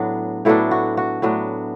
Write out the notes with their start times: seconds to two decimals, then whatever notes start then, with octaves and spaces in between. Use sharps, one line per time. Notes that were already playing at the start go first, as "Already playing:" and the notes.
Already playing: A2 F#3 B3 D4 F#4
0.45 A2 F#3 B3 D4 E4 A4
0.71 F#4
0.97 F#4
1.22 A2 F#3 B3 D4